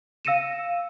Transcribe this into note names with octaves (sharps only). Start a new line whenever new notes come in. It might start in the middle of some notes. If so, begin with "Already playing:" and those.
F5 E6 A#6 C#7 D#7 E7